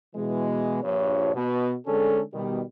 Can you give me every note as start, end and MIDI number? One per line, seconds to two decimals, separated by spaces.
0.16 0.82 47
0.16 0.82 52
0.16 0.82 56
0.83 1.34 34
0.83 1.34 43
0.83 1.34 53
0.83 1.34 73
1.35 1.74 47
1.86 2.21 50
1.86 2.21 56
1.86 2.21 60
1.86 2.21 61
1.86 2.21 68
1.86 2.21 69
2.33 2.61 47
2.33 2.61 51
2.33 2.61 55